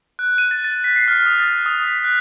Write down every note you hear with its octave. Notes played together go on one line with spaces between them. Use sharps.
F#6
D#7
A6
A6
B6
C7
F6
D#6
A6
D#6
B6
F#6